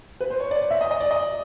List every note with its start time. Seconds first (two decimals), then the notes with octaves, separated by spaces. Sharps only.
0.21 B4
0.30 C5
0.40 C#5
0.51 D5
0.70 E5
0.81 D#5
0.91 D#5
1.00 D5
1.11 D#5